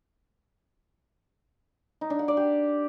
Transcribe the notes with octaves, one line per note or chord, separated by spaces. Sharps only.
D#4
D4
F#5
D5
G4